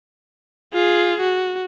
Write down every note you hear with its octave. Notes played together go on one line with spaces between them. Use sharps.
F4 G#4
F#4